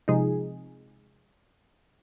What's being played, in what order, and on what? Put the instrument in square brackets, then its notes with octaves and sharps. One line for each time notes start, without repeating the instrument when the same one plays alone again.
[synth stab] C3 F3 G#3 D#4 G#4